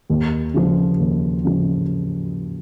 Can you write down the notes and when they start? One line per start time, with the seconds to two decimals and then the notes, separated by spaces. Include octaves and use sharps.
0.10 D#2
0.54 C#3 F3
1.00 D#2
1.45 C#3 F3